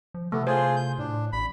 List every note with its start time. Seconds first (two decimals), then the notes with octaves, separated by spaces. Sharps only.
0.14 F3
0.32 C3 A3 B3
0.47 F4 G#4 C5
0.76 G6
0.98 A2 D4
1.32 A1 B5